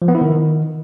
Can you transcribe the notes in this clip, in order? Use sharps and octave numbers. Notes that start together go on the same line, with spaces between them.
F3
B3
E4
D#3